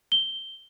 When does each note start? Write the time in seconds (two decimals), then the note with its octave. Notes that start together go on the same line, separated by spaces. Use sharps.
0.12 G7